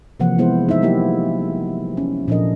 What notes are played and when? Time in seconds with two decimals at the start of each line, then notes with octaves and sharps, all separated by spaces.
0.20 C3 E3 F3 A#3 F#5
0.38 G#3 B3 E4 G#4 C5
0.69 D#4 E4 E5
0.82 F#3 A#3 E4 G4
1.97 C#4
2.28 A#2 F3 D4 A4 A#4 D#5